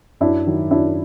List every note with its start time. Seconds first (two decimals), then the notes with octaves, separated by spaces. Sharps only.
0.21 F#2 D4 E4
0.47 D#3 F#3
0.71 F#2 D4 E4